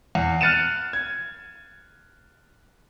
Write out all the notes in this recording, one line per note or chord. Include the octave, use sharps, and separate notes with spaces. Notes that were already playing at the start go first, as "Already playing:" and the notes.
E2
F6 F#6 A6 C#7 D#7 E7
G#6